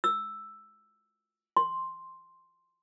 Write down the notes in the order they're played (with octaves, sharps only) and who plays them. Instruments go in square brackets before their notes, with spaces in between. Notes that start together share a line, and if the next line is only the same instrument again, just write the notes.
[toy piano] E6
C6